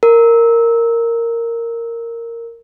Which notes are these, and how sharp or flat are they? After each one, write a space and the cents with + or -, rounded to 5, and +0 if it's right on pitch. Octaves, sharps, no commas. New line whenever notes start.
A#4 -10